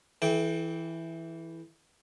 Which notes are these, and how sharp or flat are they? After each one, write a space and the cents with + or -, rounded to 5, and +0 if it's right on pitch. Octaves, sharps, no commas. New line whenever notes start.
E3 +0 A4 -40 G5 +0